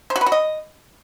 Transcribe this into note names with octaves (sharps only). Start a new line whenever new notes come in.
C5
F#4
B4
F#4
D#5